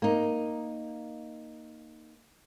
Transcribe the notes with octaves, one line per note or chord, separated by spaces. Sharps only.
A#3 D#4